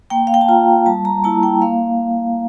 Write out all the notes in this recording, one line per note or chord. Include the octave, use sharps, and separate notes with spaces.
A#3 G5
F5
G5
A5
F4 A#5
G3 A5
A#5
A#3 E4 A5
G5
A#3 F5